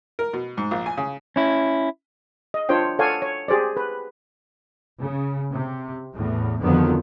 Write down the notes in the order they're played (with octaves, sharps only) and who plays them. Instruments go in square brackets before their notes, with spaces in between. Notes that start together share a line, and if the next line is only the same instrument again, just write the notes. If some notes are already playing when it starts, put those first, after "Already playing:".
[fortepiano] A#4
B2
G#2
A#1
G#5
C#3
[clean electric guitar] C#4 E4
[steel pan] D#5
D4 F4 C5 C#5 G5
A4 C#5 D5 F5 F#5 G#5
C#5
G4 G#4 C5 D5
B4
[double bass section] C#3
C3
E2 A2
F2 D3 D#3 F3 F#3 B3